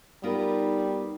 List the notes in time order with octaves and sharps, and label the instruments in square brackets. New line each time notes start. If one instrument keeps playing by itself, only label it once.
[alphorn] G3 [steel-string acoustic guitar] B3 F4 A#4 [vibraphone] D#4